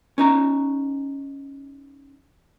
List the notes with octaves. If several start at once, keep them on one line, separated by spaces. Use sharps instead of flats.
C#4 D#4 A#5